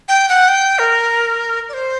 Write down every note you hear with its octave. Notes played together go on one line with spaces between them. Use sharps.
G5
F#5
G5
A#4
D5
C5